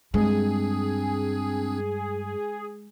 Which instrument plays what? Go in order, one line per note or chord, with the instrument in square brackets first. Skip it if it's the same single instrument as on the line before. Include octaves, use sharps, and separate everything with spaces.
[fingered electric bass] G2 [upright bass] G#3 [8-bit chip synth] C4 D4 [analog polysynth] G#4